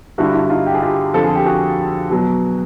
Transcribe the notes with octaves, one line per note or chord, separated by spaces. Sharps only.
G2 D3 G3 E4 F#4
E4
D#4 F4
G4
G#4
F4 G4
F2 D3 F3 A4
G#4
G4
F#4 G#4
B2 F#3